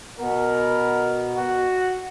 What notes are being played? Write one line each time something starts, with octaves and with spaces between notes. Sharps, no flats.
B2 B3 A#4
F#4